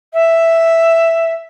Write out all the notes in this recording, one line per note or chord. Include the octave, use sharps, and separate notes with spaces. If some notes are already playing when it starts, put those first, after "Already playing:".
E5